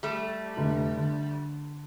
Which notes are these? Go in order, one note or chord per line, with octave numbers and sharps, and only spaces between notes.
G3 A3
F1 D3
D3